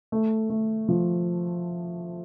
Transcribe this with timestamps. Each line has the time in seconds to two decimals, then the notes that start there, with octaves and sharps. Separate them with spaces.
0.12 A3
0.50 A3
0.89 F3